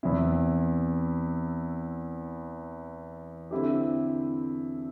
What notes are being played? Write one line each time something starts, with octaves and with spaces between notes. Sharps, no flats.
E2 E3 C4 E4
D3 C4 E4 G4